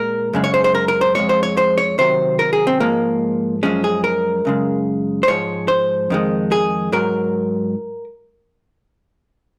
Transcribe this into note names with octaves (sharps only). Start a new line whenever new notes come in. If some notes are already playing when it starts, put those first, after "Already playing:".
Already playing: A#2 G#3 A#4
F#2 C#3 G#3
C#5
C5
C5
A#4
A#4
C5
F2 C#3 G#3 C#5
C5
C#5
C5
C#5
C3 D#3 F#3 C5
A#4
G#4
C4
G#2 F3 G#3 A#3
F#2 F3 G#3 C#4
G#4
A#4
F#2 C#3 G#3
C5
G#2 F3 G#3 C#5
C5
F2 D#3 G#3
G#4
G#2 F#3 A#4